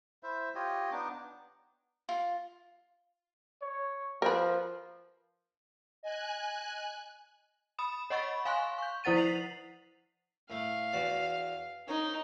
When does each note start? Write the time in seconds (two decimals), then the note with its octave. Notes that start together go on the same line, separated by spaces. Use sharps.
0.23 E4 C5 E5
0.55 F4 G4 C#5 D#5
0.92 B3 D4 D#4 D6
2.09 F4
3.62 C#5
4.22 F3 A#4 B4
6.03 D#5 G#5 F#6
7.79 B5 D#6 E7
8.10 C#5 D#5 F#5 B5 C#6 A6
8.45 F5 G#5 C6 C#6 F#6
8.78 C#6 G6
9.04 F3 E4 C5 F#5 A6 D#7
9.16 B6 C7 F7 F#7
10.50 A2 A3 F5
10.93 E2 F#4 D5
11.88 D#4 A#4 C#5